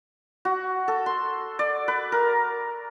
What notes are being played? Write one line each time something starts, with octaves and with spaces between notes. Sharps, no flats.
F#4
A4
C6
D5
B4
A#4